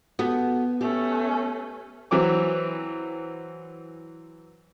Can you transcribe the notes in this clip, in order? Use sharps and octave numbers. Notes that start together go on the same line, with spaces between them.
B3 F#4 G4 A4
A3 C#4 G4
E3 F#3 C4 D6